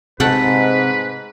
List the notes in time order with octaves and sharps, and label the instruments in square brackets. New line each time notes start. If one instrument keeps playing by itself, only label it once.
[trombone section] G#2 [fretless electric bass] C3 [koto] A3 F#5 G5 [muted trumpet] B4